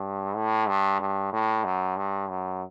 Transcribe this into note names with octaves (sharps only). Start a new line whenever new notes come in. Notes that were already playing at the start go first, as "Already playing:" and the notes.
Already playing: G2
A2
G2
G2
A2
F#2
G2
F#2